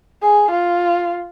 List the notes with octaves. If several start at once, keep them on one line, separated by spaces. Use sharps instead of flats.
G#4
F4